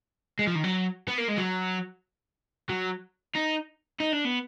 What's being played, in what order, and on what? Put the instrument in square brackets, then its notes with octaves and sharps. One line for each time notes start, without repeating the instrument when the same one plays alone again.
[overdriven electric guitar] G#3
F3
D#3
F#3
B3
A#3
G#3
F#3
F#3
D#4
D#4
D4
B3